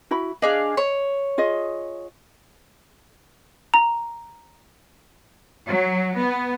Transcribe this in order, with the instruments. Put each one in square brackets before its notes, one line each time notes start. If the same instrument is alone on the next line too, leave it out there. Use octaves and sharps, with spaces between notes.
[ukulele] E4 F#4 B5
[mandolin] D4 G#4 F5 [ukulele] D#5
[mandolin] C#5
[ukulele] F4 G#4 D#5
[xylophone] A#5
[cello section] F#3
B3